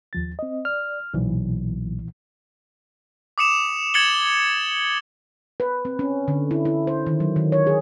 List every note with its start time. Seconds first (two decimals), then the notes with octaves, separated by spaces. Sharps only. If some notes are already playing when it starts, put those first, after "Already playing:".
0.13 D#2 F3 A6
0.39 C4 D#5
0.65 D5 F6
1.14 B1 A#2 E3
3.38 D6 D#6 C#7 E7 F7
3.94 G#6 A6 C#7 E7 F#7 G7
4.14 G7
5.60 B4
5.85 C4
5.99 C#4
6.28 D3
6.51 E4
6.65 E4
6.87 C5
7.07 D#3
7.20 F#3
7.36 D#3
7.52 C#5
7.67 G#4